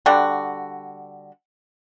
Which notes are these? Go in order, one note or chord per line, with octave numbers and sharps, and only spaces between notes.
D3 G3 F#4